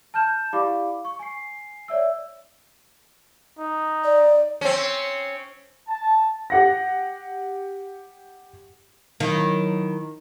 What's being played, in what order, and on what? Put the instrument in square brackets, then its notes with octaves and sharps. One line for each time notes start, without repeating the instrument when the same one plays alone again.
[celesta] A5 F6 G6 E7
E4 G4 D5 F5 B5 D6
C#6
G#5 C7
C#5 D5 E5 E6
[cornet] D#4
[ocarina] D5
[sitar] C4 C#4
[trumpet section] A5
[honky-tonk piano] G4 F#5 A#6
[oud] D#3 [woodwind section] F#3 E4